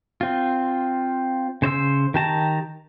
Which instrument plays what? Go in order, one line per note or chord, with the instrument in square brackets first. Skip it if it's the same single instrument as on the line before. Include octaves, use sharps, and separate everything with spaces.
[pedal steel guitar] C4 F4
C#3 C5 D5 E6
D#3 G4 A5 A#5